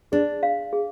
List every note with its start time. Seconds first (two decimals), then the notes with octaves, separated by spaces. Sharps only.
0.12 D4 G#4
0.43 F5
0.73 G#4